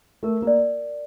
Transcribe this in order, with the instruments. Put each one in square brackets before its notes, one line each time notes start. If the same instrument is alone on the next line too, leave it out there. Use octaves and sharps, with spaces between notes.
[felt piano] A3 [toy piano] A#4
[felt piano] A#3
[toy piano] D5